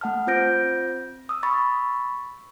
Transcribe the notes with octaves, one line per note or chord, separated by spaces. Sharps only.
A3 F#5 A5 F6
C4 F4 C5 G6 A#6 D7
D#6 E6
B5 C#6 A6